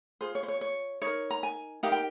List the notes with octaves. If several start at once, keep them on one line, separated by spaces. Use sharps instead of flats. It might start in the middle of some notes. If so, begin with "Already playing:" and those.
F4 G#4 C5
C#5
C5
C#5
C#5
D#4 A#4 C#5
A#5
G#5
D#4 G4 A#4 F5
G5